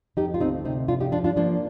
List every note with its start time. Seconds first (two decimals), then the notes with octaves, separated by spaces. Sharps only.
0.17 F2 D#4 G4
0.34 F4
0.40 D2 C4 D#4
0.65 C3 C4 D#4
0.88 F2 D4 F4
1.00 D#4 G4
1.12 F3 D4 F4
1.24 D4 F4
1.36 F3 A#3 D4